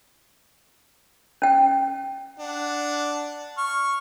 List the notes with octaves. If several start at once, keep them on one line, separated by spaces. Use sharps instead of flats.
C#4 G5
D4 F#5
C#6 F6